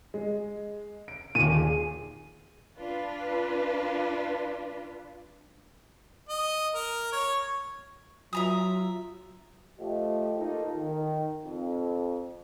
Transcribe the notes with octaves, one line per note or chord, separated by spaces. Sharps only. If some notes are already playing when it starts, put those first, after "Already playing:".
G#3
D7
D#2 A#2 D#7
G#4
D4 F4 B4
D#5
A#4
C#5
F#3 F4 E5 A#5 D#6
F3 A3 F4 G4 D#5
A#3 D#4 F4 A4
D#3
F2